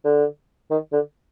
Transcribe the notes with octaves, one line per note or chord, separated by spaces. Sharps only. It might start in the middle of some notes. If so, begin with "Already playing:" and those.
D3
D#3
D3